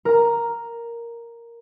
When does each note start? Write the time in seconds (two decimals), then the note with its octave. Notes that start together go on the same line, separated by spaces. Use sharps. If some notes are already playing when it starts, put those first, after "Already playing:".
0.05 A#4 A#5